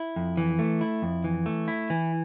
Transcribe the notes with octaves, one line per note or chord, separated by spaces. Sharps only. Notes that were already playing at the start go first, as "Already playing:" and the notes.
Already playing: E4
F2
E3
A3
E4
F2
E3
A3
E4
E3